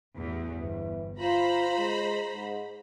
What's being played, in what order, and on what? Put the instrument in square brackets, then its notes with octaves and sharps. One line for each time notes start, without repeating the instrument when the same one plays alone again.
[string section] A1 E2
[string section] G1 [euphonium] E3
[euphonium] F4 [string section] C5 A#5 B5
[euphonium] G#3
G#2